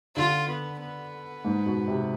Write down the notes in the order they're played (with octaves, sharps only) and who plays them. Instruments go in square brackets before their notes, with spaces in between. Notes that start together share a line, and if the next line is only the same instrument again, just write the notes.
[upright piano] D3 [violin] F4
[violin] B3
B3
[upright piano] G#2
B2
C3